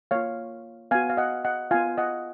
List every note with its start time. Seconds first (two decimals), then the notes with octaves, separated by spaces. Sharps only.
0.11 A#3 F4 C#5 F5
0.91 B3 F#4 F5 G#5
1.10 F5
1.17 D#5 F#5
1.45 D#5 F#5
1.71 B3 F4 F5 G#5
1.98 D#5 F#5